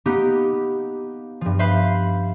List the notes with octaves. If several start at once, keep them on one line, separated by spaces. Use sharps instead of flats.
A#3 B3 D#4 G4
G2 F3
B4 C5 E5 F5 B5